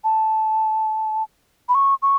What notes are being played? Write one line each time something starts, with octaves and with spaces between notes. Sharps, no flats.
A5
B5
C#6
C#6